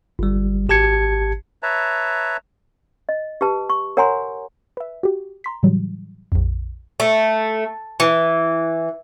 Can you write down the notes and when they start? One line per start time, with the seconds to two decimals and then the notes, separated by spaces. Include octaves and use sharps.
0.19 G1 G3
0.69 G#1 G4 A5 G#6 C#7
1.63 B4 C#5 E5 A5 A#5
3.09 D#5
3.41 G4 B4 A5
3.70 C#6
3.97 A#4 C#5 F#5 G#5 A#5 C6
4.77 B4 E5
5.03 F#4 G4
5.44 A#5 C6 B6
5.63 A2 C#3 E3 F#3 G3
6.32 A#1 F2
7.00 A3
8.00 E3